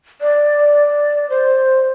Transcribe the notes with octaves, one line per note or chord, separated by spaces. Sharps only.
D5
C5